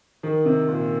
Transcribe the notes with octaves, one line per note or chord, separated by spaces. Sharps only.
D#3
C3
A#2